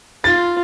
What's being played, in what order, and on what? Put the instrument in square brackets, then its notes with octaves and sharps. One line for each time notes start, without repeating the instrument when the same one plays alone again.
[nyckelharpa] F4 [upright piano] A6